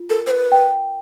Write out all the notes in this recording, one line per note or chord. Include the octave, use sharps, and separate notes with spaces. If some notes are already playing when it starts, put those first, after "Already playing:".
Already playing: F4
A4 A#4
C5
B4
G5